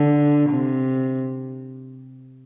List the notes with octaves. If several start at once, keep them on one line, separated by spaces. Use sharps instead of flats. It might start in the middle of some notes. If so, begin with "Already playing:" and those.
Already playing: D3
C3